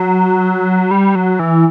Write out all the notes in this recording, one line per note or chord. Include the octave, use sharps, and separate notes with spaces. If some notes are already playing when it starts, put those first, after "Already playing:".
Already playing: F#3
G3
F#3
E3